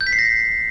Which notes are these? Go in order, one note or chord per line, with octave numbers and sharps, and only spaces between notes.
G6
B6
C7
A#6